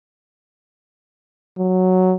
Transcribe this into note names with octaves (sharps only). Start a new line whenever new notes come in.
F#3